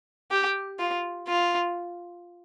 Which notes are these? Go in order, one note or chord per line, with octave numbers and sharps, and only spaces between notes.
G4
F4
F4